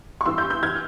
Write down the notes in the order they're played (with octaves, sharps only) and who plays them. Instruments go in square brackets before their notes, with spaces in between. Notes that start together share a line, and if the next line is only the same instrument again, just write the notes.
[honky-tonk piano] C#6
G2 E3 C6 E6
E6 G6
E6 G6
E3 F6 G#6